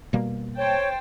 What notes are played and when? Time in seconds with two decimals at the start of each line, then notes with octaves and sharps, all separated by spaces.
0.13 B2 G3 A#3
0.57 C5 C#5 G5 A5